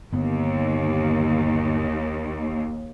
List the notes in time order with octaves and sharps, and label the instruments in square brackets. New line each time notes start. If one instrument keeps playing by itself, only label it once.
[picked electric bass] G1 B3 [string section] D#2